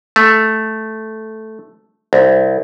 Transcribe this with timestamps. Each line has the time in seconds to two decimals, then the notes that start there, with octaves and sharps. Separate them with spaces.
0.16 A3
2.13 C2